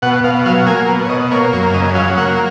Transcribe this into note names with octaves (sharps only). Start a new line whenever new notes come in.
B2 F#5
B2 F5
F#3 F5
A#3 G#5
B2
C#5
B2 D#5
A#3 C#5
F#2 C#5
C#3 D#5
F#3 F5
A#3 F#5